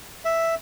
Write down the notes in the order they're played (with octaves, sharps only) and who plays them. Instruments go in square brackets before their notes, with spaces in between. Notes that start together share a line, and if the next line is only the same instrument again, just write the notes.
[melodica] E5